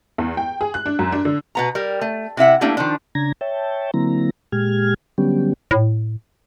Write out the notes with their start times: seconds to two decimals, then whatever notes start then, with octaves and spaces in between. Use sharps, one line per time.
0.18 E2
0.37 G5
0.61 G#4
0.74 F#6
0.86 D4
0.99 F#2
1.12 D4
1.25 D3
1.55 B2 B3 A#5
1.75 G3 A#4
2.01 A3
2.37 C3 E4 E5 F#5
2.61 G3 A3 A#3 D4 E4
2.77 D#3 F3 D4
3.15 C#3 D4 A#5 G#6 A#6
3.41 C#5 E5 G5 A5
3.94 D3 F#3 A#3 C4 E4 A#5
4.52 A#2 G#3 G4 F6 G#6
5.18 D3 F#3 G3 B3 C#4 G4
5.71 A2